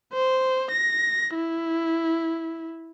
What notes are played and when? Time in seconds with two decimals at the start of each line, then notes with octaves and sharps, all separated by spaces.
0.13 C5
0.72 A#6
1.35 E4